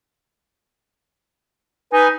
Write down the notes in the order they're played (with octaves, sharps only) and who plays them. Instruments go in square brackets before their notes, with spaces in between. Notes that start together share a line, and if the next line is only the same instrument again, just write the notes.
[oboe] D#4 [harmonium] B4 G#5